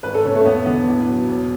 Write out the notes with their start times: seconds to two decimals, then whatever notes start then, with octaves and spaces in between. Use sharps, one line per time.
0.03 G#1 B4
0.14 A4
0.24 C#3 C#4
0.35 A3
0.41 C#4
0.45 E1 B3
0.66 D3 B3
0.87 A1
1.08 F#3
1.29 E1